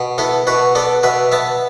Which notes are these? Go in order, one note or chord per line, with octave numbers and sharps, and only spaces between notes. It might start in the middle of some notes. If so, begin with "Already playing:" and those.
Already playing: B2
B3 E4 A4
B2 F#4 B4
B3 A4 D5
B2 B4 E5
B3 E5 A5